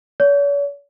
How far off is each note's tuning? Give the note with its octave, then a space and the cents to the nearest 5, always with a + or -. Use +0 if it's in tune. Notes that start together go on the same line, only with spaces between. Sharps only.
C#5 +45